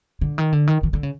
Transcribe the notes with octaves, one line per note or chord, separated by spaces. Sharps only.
D3
D#3
D3
D#3
D#3
D3
C#3